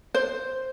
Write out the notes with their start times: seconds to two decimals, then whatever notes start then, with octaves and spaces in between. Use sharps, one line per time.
0.14 C5